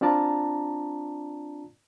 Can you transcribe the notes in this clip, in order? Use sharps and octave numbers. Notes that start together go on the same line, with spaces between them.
C4 D4 F4 D5 A5 A#5